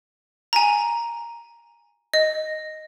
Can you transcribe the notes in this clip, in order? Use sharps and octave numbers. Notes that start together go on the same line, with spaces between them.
G#5 A#5
D#5